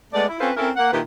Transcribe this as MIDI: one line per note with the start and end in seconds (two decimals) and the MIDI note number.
0.13 0.25 56
0.13 0.25 57
0.13 0.25 59
0.13 0.25 74
0.28 0.37 64
0.40 0.50 60
0.40 0.50 61
0.40 0.50 65
0.40 0.50 69
0.40 0.50 71
0.40 0.50 72
0.57 0.70 60
0.57 0.70 61
0.57 0.70 64
0.57 0.70 69
0.57 0.70 70
0.76 0.88 58
0.76 0.88 78
0.92 1.00 46
0.92 1.00 51
0.92 1.00 64
0.92 1.00 67
0.92 1.00 71